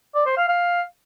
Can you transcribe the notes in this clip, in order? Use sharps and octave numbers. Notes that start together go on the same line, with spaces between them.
D5
C5
F5
F5